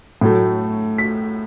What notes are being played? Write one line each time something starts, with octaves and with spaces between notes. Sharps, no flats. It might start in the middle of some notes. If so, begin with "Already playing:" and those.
A2 F#3 A3
B6